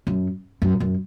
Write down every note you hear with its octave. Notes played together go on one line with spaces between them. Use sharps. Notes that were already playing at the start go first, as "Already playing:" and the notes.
F#2
F#2
F#2